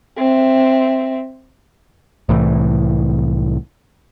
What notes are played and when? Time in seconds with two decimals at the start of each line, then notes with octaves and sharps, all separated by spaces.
0.18 C4 E5
2.29 C2 A2 E3